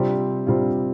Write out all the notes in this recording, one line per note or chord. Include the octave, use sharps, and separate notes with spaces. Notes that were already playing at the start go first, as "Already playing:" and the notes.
Already playing: C3 G3 C4 F4
C3 G3 C4 F4